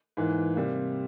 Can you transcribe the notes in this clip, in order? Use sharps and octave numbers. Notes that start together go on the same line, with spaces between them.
G#2 E3 A#3
C3 G3 A#3